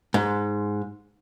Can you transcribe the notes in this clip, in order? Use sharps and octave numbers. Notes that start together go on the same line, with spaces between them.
G#2